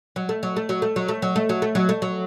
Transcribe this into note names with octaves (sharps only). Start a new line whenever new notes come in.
F#3
A3
F#3
A3
F#3
A3
F#3
A3
F#3
A3
F#3
A3
F#3
A3
F#3